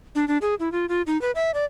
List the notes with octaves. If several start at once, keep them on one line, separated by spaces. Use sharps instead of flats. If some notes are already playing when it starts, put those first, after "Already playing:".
D4
D4
G#4
E4
F4
F4
D#4
B4
E5
D5